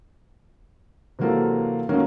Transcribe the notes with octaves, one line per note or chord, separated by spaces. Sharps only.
C3 E3 F#3 A#3 F4 A4
D#3 F#3 A3 A#3 C#4